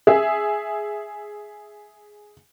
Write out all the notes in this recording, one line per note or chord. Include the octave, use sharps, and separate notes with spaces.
G#4 E5